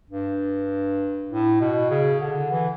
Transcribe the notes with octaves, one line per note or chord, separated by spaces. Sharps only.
G2
A2
B2
C#3
D3
E3